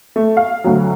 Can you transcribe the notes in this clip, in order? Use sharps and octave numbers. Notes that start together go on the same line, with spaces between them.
A3
F5
D2 F#3